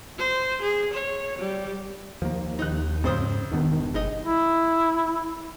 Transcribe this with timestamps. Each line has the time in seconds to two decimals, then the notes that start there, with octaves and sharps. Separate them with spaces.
0.19 C5
0.62 G#4
0.94 C#5
1.39 G3
2.22 D#2 F3 A#3
2.59 D#4 F#6
3.04 F2 G#2 C#3 C5 D#6
3.52 E1 G2 D#3 B3
3.94 G1 G#3 D#4 D#5
4.24 E4